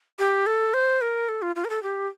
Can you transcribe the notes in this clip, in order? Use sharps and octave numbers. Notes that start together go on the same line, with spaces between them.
G4
A4
C5
A#4
A4
F4
F4
A#4
A4
G4